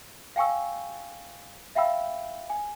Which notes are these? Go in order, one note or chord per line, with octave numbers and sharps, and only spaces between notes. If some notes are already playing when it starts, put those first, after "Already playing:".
F5 G5 G#5 C#6 E6
E5 F5 G5 B5 E6
G#5